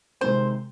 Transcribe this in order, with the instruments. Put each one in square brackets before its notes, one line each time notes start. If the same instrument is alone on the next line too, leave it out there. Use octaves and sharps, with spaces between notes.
[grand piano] C3 D#3 G#3 C4 [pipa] C5